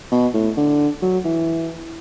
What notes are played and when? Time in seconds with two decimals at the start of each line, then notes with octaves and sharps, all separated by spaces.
0.11 B2
0.33 A2
0.57 D3
1.02 F#3
1.25 E3